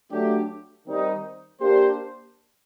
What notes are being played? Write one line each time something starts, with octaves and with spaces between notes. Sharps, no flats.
F#3 A3 D4 G4
D#3 G3 C4 D#4
A#3 D4 G4 C5